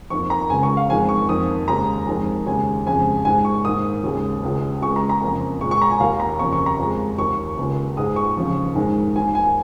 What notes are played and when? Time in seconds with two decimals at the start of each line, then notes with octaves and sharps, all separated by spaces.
0.10 F2 D#3 A#3 C#6
0.30 A#5
0.50 C#2 C#3 G#3 G#5
0.63 C#6
0.77 F5
0.89 F2 D#3 G#3 G#5
1.09 C#6
1.29 F2 D#3 A#3 D#6
1.68 D#2 C#3 G#3 A#5
2.07 F2 D#3 G#3
2.46 D#2 C#3 G#3 G#5
2.86 F2 C#3 G#3 G#5
3.25 G#2 D#3 G#3 G#5
3.45 C#6
3.64 G#2 D#3 A#3 D#6
4.04 D#2 C#3 G#3
4.43 C#2 C#3 G#3
4.82 C#2 C#3 G#3 C#6
4.96 A#5
5.09 A#5
5.22 F2 C#3 A#3
5.61 A#2 G#3 C#6
5.71 C#6
5.82 A#5
5.90 G#5
6.00 D#2 D#3 A#3 F5
6.20 A#5
6.39 F2 C#3 A#3 C#6
6.53 C#6
6.66 A#5
6.79 F2 F3 G#3
7.18 D#2 D#3 A#3 C#6
7.57 C#2 C#3 A#3
7.97 G#2 G#3 D#6
8.16 C#6
8.37 D#2 C#3 F3
8.75 G#2 D#3 G#3
9.16 D#2 D#3 A#3 G#5
9.35 G#5